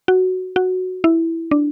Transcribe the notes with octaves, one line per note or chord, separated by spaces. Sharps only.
F#4
F#4
E4
D4